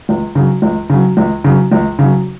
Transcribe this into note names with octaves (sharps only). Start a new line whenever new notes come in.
C#2
C#3 F#3
C#2
C#3 F#3
C#2
C#3 F#3
C#2
C#3 F#3